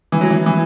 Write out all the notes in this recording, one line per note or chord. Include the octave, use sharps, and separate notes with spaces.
E3
F#3
E3
E3